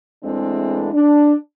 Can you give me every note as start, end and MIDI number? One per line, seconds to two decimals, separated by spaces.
0.23 0.90 40
0.23 0.90 52
0.23 0.90 56
0.23 0.90 57
0.23 0.90 60
0.23 0.90 62
0.92 1.34 62